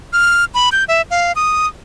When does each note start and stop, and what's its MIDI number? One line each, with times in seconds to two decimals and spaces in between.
0.13 0.45 89
0.54 0.69 83
0.72 0.84 91
0.88 1.02 76
1.11 1.32 77
1.36 1.67 87